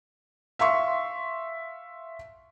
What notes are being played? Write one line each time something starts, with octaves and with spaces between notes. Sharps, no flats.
E5 F5 C6 C#6